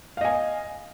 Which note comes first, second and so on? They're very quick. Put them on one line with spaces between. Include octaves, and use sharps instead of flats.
F5 D#5 G#5